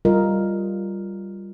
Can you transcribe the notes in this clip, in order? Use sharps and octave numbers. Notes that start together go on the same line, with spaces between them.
G3 F4 A#4 D#5